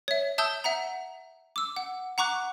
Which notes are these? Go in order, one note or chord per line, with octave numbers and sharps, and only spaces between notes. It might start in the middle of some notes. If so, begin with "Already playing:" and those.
C#5 E5
E5 A5 D#6 E6 G6 G7
E5 F#5 A#5
D6 E6
F#5
F#5 A#5 C#6 D6 F#6